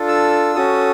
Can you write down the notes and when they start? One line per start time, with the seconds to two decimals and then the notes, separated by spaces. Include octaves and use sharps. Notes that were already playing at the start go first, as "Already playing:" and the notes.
Already playing: D4 F4 A4
0.08 E6
0.55 C#4 F#4 A4 D#6